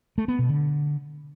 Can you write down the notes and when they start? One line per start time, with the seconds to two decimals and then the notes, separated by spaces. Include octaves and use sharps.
0.18 A3
0.28 B3
0.39 B2
0.49 D3